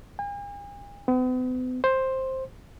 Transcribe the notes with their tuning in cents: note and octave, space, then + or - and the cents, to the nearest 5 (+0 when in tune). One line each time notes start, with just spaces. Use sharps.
G#5 -45
B3 +45
C5 +10